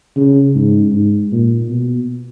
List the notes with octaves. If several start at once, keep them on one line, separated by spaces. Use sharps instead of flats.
C#3
G#2
G#2
A#2
B2